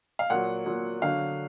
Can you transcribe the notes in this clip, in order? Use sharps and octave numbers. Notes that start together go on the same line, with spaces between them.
F5
A#2 F#3 F#5
A#2 F#3
D3 F#3 F5